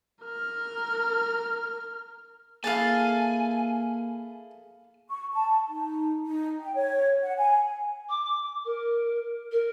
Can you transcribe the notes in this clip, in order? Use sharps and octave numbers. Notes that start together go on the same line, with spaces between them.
A#4 F6
A#3 E4 G#4 A4 F5 G#5 A5
C#6
A5
D#4
D#4
G5
C#5
F#5
G#5
D6
A#4
A#4